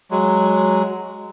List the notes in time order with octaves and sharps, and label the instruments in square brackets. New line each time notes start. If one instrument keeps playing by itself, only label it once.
[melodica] F#3 G#3